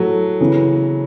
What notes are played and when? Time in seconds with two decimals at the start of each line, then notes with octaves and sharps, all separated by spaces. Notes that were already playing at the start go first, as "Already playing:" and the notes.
Already playing: A2 F#3 A3
0.40 C#3 E3 B3